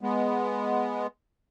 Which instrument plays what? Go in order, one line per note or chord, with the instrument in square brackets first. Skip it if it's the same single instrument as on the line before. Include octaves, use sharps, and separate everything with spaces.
[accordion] G#3 B3